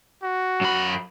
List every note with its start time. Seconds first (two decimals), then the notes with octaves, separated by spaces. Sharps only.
0.23 F#4
0.61 F#2 B5